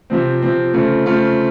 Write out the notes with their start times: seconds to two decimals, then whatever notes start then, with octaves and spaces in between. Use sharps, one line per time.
0.10 C3 F3 C4
0.42 C3 F3 C4
0.73 C#3 A3 C4 F4
1.05 C#3 A3 C4 F4